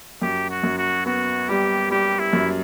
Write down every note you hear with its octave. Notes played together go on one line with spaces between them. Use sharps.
F#2 G4
F#4
F#2
F#4
B3 F#4
G3 G4
G3 G4
E4
F#2